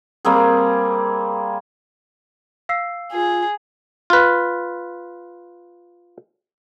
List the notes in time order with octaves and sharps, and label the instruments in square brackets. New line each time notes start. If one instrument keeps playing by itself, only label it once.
[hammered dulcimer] G3 A#3 C4 G#4
[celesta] F5 E6 C7
[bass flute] F4 [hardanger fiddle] G#4
[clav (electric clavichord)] F4 B4